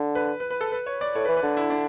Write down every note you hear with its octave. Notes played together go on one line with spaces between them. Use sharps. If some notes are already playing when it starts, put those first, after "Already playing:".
Already playing: D3
B4
B4
B4
A4
B4
C#5
D5
A2 C#5
B4
E3
B4
D3
E4
D4